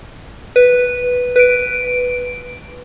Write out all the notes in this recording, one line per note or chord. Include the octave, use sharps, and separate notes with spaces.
B4
B4 D7